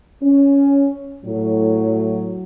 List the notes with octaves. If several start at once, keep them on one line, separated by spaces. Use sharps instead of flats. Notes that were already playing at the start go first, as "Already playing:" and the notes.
C#4
A2 F#3